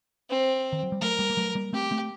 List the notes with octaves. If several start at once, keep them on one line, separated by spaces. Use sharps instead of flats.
C4
D#3
F#3
G3
F#3 A3 A#4
G3 A#3
A#3
F#3 A3
G3 A#3
A3 C4 G4
A3 C4